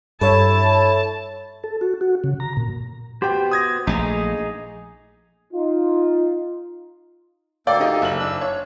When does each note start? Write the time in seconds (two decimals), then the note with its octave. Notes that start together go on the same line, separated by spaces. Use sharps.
0.21 G2 E4 A4 C#5 E5 A5
1.64 A4
1.81 F#4
2.01 F#4
2.24 C#3
2.40 A#5
2.57 A#2
3.22 B3 F#4 G4 C5 G5
3.51 D#6 G#6 A#6
3.87 A#1 A3 D#4 G#4 A#5
5.54 D#4 F4
7.67 D2 A#3 A4 D5 G5
7.80 D#4 G4 D#5
8.02 F#1 F#7
8.19 D4 E6
8.41 C#5